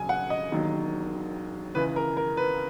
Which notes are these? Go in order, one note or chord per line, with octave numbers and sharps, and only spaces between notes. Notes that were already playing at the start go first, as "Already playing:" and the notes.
Already playing: E1 C#3 F#3 G#5
F#5
D#5
E1 D#2 D#3 F#3
C#2 C#3 E3 B4
A#4
A#4
B4